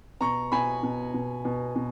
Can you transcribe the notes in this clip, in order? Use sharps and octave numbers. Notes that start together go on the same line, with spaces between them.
B2 A#5 C#6
B2 G#5 B5
B2
B2
B2
B2